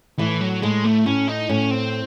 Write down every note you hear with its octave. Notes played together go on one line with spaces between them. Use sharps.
A2 E3
F#3
A2 G#3
A3
A2 C#4
D#4
A2 C#4
C4